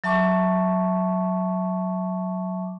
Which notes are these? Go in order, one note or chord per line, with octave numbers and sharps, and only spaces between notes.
F#3 E5 A5 C#6 D6